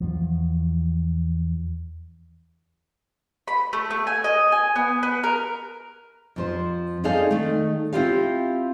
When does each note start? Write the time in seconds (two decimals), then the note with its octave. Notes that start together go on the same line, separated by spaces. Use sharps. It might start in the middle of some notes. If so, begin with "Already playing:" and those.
0.01 E2 F3
3.48 B5
3.73 A3
3.91 A3
4.07 G#5
4.24 D#5
4.52 G#5
4.76 B3
5.03 B3
5.24 A#4
6.36 F2 F3 C5
7.04 C4 D#4 G#4 A4 D5 F5
7.31 D#3 A3
7.93 C4 C#4 E4 F4 G4 F5